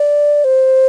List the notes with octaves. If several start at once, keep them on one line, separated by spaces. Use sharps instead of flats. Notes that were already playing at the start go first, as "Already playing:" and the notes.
Already playing: D5
C5